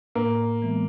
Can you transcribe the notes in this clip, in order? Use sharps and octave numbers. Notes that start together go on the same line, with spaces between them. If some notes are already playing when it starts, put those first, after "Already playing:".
A2 A#3
E3 G#3 B3